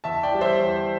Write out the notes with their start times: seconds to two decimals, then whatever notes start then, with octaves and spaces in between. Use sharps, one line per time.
0.04 E2 E5 A5
0.23 D5 G5
0.31 E3 G3
0.41 C5 E5
0.60 E2